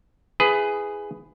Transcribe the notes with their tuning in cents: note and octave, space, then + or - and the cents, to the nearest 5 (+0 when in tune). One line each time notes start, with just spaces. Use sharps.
E4 +0 G#4 +0 B4 +20